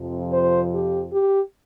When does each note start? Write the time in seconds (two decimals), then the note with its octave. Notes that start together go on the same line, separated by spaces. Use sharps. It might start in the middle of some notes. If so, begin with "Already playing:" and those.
Already playing: F2 C3 F3
0.30 C5
0.71 G4
1.10 G4